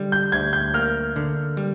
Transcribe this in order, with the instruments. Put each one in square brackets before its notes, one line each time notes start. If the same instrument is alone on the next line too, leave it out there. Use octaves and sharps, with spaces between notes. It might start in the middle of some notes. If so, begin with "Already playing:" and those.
Already playing: [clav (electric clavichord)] D3 G3
[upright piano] G6
[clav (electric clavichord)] D2 [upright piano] G#6
[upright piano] G6
[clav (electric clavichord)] A#3 [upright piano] F6
[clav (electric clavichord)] D3
G3